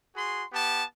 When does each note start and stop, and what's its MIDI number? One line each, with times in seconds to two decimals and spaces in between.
0.14 0.43 66
0.14 0.43 68
0.14 0.43 84
0.51 0.82 59
0.51 0.82 67
0.51 0.82 81